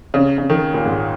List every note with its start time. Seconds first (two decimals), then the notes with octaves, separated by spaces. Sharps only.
0.14 C#3
0.38 C#3
0.50 D#3
0.74 A#2
0.86 G#2